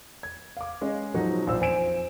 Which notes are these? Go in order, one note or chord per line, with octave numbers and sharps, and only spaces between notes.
G#6
F5 D6
G#3 C#4 G#4 D#5
B2 F3 F#3 D#4
A#1 F4 C5 E6
F2 C5 G#5 D7 E7